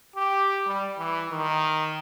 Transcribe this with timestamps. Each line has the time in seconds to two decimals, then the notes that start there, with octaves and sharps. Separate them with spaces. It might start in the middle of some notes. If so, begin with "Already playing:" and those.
0.16 G4
0.67 G3
0.98 E3
1.31 D#3